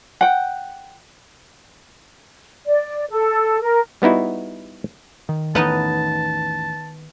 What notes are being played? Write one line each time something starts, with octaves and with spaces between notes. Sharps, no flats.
F#5 G5
D5
A4
A#4
G3 B3 D#4 E4 F#4
D#3
A1 E2 B3 D#4 D#5 A5